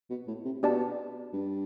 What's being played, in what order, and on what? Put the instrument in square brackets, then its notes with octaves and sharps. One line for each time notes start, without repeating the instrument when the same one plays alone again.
[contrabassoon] B2
A2
C3
[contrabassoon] B2 [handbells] D4 G4 D5 A5
[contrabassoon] G2